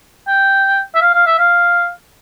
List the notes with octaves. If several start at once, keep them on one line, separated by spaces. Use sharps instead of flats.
G5
E5
F5
F5
E5
F5